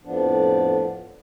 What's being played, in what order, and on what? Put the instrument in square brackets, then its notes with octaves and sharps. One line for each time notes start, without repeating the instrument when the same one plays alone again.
[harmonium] F2 A2 F3 B3 D4